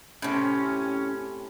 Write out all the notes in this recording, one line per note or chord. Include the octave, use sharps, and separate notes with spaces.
A2 C3 C#4